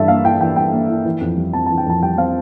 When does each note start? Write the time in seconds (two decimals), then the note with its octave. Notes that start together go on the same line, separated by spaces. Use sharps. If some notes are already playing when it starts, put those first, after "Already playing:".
Already playing: G2 E3 A4 E5
0.08 A#3 F5
0.24 E4 G5
0.41 E3 G5
0.56 G2 G5
0.72 A#3
0.89 E4
1.05 E3
1.21 F2
1.37 G3
1.53 C4 A5
1.66 A5
1.70 E3
1.78 G5
1.86 F2 A5
2.03 G3 G5
2.18 C4 F5